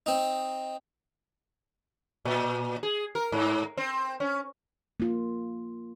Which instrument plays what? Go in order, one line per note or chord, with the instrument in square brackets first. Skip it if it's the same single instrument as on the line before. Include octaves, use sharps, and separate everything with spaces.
[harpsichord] C4 D#4
[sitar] A#2
G#4
A#4
G#2
C4
C#4
[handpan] A#3 F4